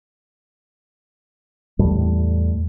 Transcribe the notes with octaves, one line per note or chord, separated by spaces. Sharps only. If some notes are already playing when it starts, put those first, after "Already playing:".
E2 A2 G3 A3